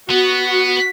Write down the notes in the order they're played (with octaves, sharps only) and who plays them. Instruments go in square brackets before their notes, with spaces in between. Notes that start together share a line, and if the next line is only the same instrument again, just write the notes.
[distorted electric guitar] B3 [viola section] F#4